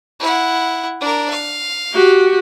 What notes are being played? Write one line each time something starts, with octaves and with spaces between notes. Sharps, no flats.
E4 F#5
D4 A#4
F5
F#4 G4